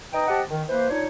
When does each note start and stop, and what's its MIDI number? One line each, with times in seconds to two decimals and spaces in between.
0.13 0.25 63
0.13 0.25 71
0.13 0.25 75
0.13 0.25 79
0.13 0.25 82
0.13 0.25 87
0.28 0.42 67
0.28 0.42 72
0.28 0.42 75
0.28 0.42 78
0.28 0.42 81
0.49 0.61 51
0.69 0.88 52
0.69 0.88 58
0.69 0.88 71
0.69 0.88 72
0.90 1.07 62
0.90 1.07 63
0.90 1.07 65
0.90 1.07 73